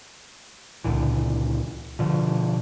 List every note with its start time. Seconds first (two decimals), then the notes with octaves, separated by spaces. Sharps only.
0.84 C#2 A#2 D3 E3
1.99 B2 D3 F3